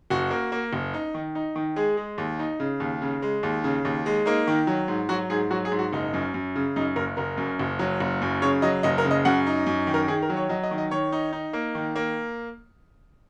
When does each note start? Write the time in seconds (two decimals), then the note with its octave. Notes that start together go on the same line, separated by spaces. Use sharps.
0.10 F#1 F#4
0.31 A#3
0.52 A#3
0.73 F#1
0.94 D#4
1.14 D#3
1.35 D#4
1.56 D#3
1.76 G#3 G#4
1.97 G#3
2.18 D#2
2.39 D#4
2.60 C#3
2.80 D#2
3.02 C#3
3.22 G#3
3.43 D#2
3.64 C#3
3.85 D#2
4.06 G#3
4.26 A#3 D#4
4.48 D#3
4.67 F#3
4.88 G#2
5.09 F#3 F#4
5.30 G#2 G#4
5.51 F#3 F#4
5.65 G#4
5.72 G#2
5.79 F#4
5.93 F#1 D#4
6.14 F#2
6.34 F#2
6.55 C#3
6.76 F#2 D#4
6.96 F#1 A#4
7.17 F#1 A#4
7.37 F#2
7.59 F#1
7.79 F#3
8.00 F#1
8.22 F#2
8.42 C#3 C#5
8.62 F#3 D#5
8.83 F#1 D#5
8.98 A#4
9.05 C#3
9.11 D#5
9.25 F#2 F#5
9.47 D#4
9.66 F#2
9.87 D#3
9.94 A#4
10.08 D#3 G#4
10.22 A#4
10.30 F#3
10.36 C#5
10.49 F#3 D#5
10.63 D#5
10.71 D#3
10.78 D#5
10.91 D#3 C#5
11.12 D#4
11.33 D#4
11.53 A#3
11.75 D#3
11.96 A#3